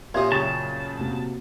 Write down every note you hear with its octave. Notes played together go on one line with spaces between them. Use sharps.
A#2 C#4 G4 E5 F5 C6 D#6 G#6
F#2 C#3 G5 A5 C#6
C3 A#3 F#4